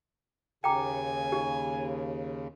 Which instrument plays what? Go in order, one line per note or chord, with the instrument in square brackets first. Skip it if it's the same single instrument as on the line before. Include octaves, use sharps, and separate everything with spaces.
[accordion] D#2 C#3 [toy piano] G5 A#5 D6 [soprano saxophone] G#5
[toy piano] D#4 G4